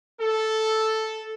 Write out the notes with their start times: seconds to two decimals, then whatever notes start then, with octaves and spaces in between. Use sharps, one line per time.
0.20 A4